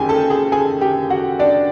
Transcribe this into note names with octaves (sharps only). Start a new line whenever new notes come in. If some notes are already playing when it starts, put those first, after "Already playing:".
Already playing: F#1 F#2 D#3 G4 G#4 G5 G#5
A4 A5
G#4 G#5
G#4 G#5
G4 G5
F#4 F#5
D4 D5